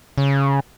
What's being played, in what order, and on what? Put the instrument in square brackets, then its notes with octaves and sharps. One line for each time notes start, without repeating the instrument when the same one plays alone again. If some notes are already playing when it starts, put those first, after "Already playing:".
[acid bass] C#3